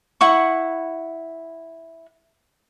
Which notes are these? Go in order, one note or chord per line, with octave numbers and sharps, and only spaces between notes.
E4 F#5 C#6